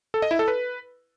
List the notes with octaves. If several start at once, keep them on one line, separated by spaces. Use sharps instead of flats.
A4
D#5
E4
A4
B4